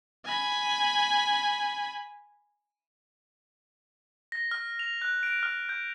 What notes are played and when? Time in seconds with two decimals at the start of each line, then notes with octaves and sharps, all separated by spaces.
0.25 G#5 B5
4.32 A#6
4.51 F6
4.79 F7
5.02 F#6
5.23 D7
5.43 F6
5.69 G6